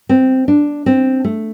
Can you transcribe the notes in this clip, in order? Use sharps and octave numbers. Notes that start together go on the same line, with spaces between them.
C4
D4
C4
A3